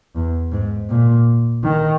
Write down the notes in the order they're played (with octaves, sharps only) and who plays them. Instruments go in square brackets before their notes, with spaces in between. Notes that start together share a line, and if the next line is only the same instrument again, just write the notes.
[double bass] E2
G#2
A#2
D#3